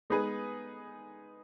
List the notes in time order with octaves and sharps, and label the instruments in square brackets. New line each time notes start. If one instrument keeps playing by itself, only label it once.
[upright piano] G#3 B3 D#4 G#4 B4